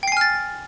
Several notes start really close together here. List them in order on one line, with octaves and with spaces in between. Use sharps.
G5 C7 G#5 F6 A6